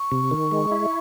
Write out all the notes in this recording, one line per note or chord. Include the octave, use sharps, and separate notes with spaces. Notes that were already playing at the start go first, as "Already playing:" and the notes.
Already playing: C#6
C3
D#3
G#3
E4